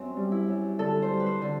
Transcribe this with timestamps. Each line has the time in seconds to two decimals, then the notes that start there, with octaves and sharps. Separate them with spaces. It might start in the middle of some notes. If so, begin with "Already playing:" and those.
Already playing: F#2 C4
0.17 G3
0.32 E4
0.48 F#2
0.79 D3 A4
1.02 C5
1.10 G3
1.20 B4
1.26 C5
1.41 D3